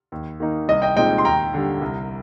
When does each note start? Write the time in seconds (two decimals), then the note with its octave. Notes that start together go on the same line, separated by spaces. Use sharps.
0.12 D#2
0.40 D#3 A#3 D#4
0.68 C2 D#5
0.82 D#5 G5
0.96 A#2 G#3 C4 D#4 D#5 G5
1.18 C6
1.24 D#2 G5 A#5
1.54 D3 G3
1.81 C2